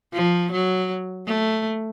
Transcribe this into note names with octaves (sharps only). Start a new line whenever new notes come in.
F3
F#3
A3